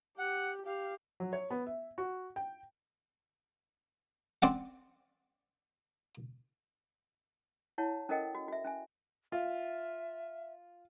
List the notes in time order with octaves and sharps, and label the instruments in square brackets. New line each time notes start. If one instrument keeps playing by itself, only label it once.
[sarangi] G4 [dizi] F#5
[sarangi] G4 [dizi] F5
[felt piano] F#3
C#5
B3
E5
F#4
G5
[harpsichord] C4 D5 F#5
[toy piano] E4 C#5 F#5 A5
C#4 A4 A#4 D#5 F#5 G5
F#4
F#4 E5
C#4 E5 G#5
[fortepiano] F4 [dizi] E5